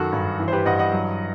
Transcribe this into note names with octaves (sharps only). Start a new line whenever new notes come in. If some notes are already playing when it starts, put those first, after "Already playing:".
Already playing: F#2 D#3 F#4 A4
G2
E3
C5
G4 B4
G2 D#5 F#5
D#5 F#5
F#3